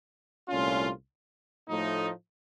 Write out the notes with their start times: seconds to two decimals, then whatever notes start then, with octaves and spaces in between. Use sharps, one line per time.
0.49 C2 A#2 A3 C#4 F4
1.68 A2 F3 A3 D#4